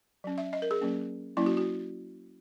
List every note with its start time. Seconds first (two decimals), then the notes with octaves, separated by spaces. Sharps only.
0.24 F#3 C#4
0.38 E5
0.53 D#5
0.62 A#4
0.71 G#4
0.81 F#3 A#3 C#4
1.37 F#3 A#3 C#4 E4
1.46 F#4
1.57 F#4